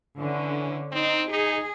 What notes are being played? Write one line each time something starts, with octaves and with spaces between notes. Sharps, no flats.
D3 E3 C#4
C4 D#4
D#4 G#4